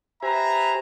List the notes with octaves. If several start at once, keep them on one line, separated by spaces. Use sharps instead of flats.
G4 B4 C5 E5 G#5 A#5